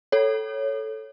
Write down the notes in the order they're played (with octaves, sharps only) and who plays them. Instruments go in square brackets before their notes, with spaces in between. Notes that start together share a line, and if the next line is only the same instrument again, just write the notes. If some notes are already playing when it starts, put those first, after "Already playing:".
[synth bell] A4 C#5